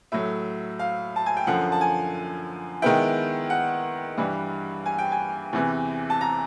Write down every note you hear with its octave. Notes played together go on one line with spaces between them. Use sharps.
A2 F#3 A3 E5
F5
A5
G#5
G5
F#2 D3 F3 F#5
A5
G#5
D#3 G#3 B3 E4 G5
F#5
G2 E3 G3
G#5
G5
G#5
E2 C3 E3
A5
A#5